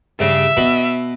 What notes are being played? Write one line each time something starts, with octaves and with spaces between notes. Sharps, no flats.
G2 C#3 E5
B2 B5